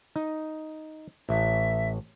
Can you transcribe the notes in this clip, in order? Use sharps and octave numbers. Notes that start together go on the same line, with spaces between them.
D#4
A1 E5